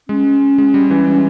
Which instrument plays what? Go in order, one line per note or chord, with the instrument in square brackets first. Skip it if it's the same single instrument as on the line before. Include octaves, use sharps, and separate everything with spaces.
[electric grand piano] G#3 [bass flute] C#4
[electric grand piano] G#3
G3
E3